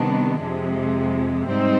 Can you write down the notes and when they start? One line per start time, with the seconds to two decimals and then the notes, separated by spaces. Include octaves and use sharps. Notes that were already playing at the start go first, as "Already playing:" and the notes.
Already playing: C3 D#3 G3 B3 D4
0.39 F2 C3 F3 G#3
1.47 G#2 G3 C4 D#4